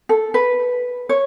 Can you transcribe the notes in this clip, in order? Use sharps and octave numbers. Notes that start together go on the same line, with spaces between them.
A4
B4
C#5